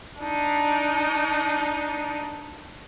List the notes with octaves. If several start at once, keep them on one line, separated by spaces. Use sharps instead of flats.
D4 D#4